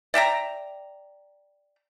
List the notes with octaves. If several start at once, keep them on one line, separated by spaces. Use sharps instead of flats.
D5 E5 G5 A#5